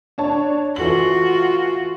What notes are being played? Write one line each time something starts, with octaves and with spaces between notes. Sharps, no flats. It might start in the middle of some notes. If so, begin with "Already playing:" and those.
D4 C#5 A5
E3 F4 F#4 A4 F#7